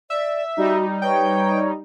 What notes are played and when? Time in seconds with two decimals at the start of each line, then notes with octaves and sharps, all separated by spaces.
0.10 D5 E5
0.57 G3 D#4 F#4
1.02 B4 C#5 G5